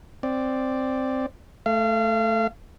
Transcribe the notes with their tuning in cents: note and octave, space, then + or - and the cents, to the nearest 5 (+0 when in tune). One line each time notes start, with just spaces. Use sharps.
C4 +0 D5 +0
A3 +0 F5 -35